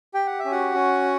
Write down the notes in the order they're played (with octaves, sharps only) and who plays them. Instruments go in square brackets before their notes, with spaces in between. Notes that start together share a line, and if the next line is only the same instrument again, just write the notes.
[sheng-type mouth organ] G4 G5
F#5
E5
C#4
F#4 F#5
C#4